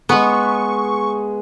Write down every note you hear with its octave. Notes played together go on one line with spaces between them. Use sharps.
G#3 B3 G#4 B4 C#6